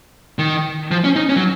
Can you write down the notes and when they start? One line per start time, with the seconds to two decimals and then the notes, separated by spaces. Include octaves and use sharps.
0.39 D#3
0.91 F3
1.04 C#4
1.16 D#4
1.29 C#4
1.36 F#3